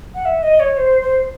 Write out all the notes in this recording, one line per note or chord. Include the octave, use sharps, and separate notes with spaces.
F#5
E5
D#5
C#5
C5
C5